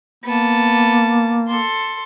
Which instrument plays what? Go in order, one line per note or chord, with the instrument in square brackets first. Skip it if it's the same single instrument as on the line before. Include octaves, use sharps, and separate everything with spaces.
[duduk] A#3 [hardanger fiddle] B3 A5
[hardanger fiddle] A4 C6